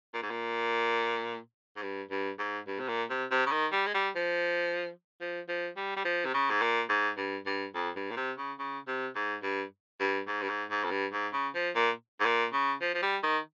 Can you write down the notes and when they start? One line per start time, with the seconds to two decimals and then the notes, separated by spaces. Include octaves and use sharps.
0.14 A#2
0.23 G#2
0.31 A#2
1.76 G#2
1.83 G2
2.11 G2
2.39 G#2
2.67 G2
2.80 C3
2.89 A#2
3.10 C3
3.31 C3
3.46 C#3
3.52 D#3
3.73 G3
3.87 G#3
3.95 G3
4.16 F3
5.21 F3
5.49 F3
5.77 G3
5.97 G3
6.05 F3
6.25 C3
6.34 C#3
6.51 G#2
6.62 A#2
6.89 G#2
7.18 G2
7.46 G2
7.75 F2
7.96 G2
8.11 A#2
8.17 C3
8.38 C#3
8.59 C#3
8.87 C3
9.16 G#2
9.43 G2
10.00 G2
10.28 G#2
10.42 G2
10.49 G#2
10.71 G#2
10.84 F2
10.91 G2
11.13 G#2
11.33 C#3
11.55 F3
11.76 A#2
12.20 G#2
12.26 A#2
12.53 C#3
12.82 F3
12.95 F3
13.02 G3
13.23 D#3